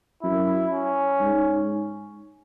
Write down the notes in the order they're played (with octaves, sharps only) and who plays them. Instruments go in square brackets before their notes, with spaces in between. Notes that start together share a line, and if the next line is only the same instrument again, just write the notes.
[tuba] F#2 [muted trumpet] E4
[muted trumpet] C#4
[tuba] G#2